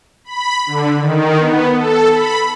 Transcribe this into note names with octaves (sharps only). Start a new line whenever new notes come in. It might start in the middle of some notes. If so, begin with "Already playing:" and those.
B5
D3
D#3
B3
A4
B5